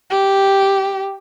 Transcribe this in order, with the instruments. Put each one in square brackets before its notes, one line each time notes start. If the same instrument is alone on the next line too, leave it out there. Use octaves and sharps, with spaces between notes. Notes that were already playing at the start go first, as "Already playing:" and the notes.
[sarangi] G4